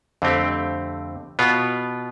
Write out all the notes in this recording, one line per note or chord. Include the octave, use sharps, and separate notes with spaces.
F2 D3 A3 C4 G4
B2 B3 F4